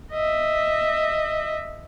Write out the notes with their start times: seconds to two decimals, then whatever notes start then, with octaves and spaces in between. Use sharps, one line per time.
0.12 D#5 E5